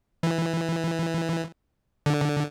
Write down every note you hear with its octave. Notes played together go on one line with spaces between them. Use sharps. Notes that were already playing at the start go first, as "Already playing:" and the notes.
E3
D3